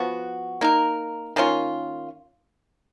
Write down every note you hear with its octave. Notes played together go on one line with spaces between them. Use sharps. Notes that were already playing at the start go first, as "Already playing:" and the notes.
Already playing: F3 B3 F#4
A#3 D#4 A#4
D#3 A#3 C#4 F4